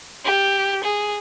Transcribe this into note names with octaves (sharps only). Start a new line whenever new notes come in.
G4
G#4